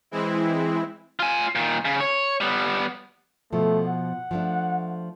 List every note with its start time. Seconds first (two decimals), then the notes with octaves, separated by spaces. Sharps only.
0.11 E3 G#3 C4 E4
1.20 F4 G#5
1.55 A#2 D#3
1.85 C#3
2.00 C#5
2.41 G3 B3
3.53 B2 F3 A3
3.88 F#5
4.31 F3 A3 D4